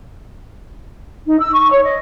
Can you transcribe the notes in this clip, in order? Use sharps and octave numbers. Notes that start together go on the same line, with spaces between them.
D#4
E6
C#6
C#5
D#5